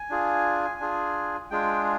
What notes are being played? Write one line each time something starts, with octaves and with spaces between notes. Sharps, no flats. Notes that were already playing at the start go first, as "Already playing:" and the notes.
Already playing: G#5
D4 F4 G#4
D4 F4 G#4
G#3 D4 F4 G#4 G5